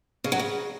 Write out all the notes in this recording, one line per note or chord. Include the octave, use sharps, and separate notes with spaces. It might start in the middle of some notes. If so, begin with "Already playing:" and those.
C#3
F#3
C#3